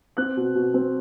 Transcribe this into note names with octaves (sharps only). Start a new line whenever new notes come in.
C4 F#6
B2
B2
C4